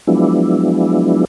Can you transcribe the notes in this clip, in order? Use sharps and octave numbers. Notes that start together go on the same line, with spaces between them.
F3 F#3 G#3 B3 D4 E4